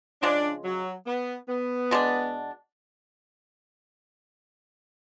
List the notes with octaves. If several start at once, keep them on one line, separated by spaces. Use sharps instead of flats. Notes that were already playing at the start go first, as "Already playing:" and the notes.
C#3 F3 G#3 D4
F#3
B3
B3
B2 G#3 D4